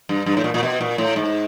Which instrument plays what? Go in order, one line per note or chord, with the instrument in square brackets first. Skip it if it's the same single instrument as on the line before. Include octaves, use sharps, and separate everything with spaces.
[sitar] G2
G2
A2
A#2
A#2
B2
A#2
A2
G#2